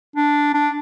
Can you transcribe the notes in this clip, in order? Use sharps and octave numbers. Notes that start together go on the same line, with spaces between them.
D4
D4